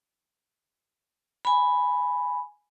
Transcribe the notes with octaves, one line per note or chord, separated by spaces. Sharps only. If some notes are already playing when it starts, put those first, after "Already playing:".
G#5 B5